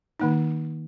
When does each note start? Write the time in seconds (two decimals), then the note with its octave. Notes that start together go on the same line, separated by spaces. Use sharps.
0.20 D#3 A#3 D#4